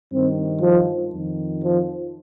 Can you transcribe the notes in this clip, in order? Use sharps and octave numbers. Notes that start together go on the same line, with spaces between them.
G2 D#3 C4
F3
F2 D#3
F3